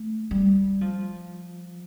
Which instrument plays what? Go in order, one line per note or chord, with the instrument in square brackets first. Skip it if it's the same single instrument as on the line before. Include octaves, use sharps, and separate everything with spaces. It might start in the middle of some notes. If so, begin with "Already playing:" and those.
Already playing: [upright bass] A3
G3
F3